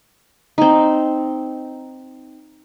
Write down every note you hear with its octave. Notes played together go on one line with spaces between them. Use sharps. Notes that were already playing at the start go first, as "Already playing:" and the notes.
C4 D#4